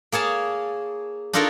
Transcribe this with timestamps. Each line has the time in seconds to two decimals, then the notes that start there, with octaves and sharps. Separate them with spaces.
0.12 A#3 G#4 C#5 A5
1.33 D4 D#4 F4 A4 A#4 C#5